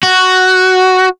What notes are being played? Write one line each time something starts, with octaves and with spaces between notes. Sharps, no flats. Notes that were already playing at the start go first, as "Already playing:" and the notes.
F#4